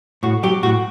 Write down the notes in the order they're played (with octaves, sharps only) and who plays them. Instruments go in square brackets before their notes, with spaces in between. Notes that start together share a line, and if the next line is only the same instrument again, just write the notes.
[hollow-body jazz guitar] A2 F#4
F#3 G4
A2 F#4